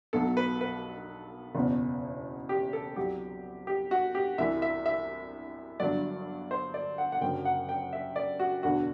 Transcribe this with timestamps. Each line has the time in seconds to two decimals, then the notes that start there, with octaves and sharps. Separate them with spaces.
0.13 B1 B2 F#3 A4
0.37 B4
0.61 B4
1.55 F#1 E2 B2
2.49 G4
2.73 A4
2.96 C2 C3 F#3 G4
3.67 G4
3.91 F#4
4.15 G4
4.38 C2 C3 E3 E5
4.62 E5
4.86 E5
5.80 G1 G2 F#3 D5
6.51 C5
6.74 D5
6.98 F#5
7.12 F#5
7.21 F#1 F#2 D3 F#3 G5
7.45 F#5
7.69 G5
7.93 E5
8.16 D5
8.40 F#4
8.63 E1 D2 D3 F#4